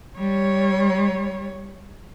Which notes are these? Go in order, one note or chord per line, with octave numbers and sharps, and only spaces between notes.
G3 C#5